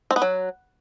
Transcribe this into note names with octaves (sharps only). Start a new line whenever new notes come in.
C4
B3
F#3